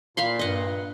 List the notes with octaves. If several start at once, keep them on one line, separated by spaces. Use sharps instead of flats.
A#2 F5 B5 C6
G2 D#5 F#5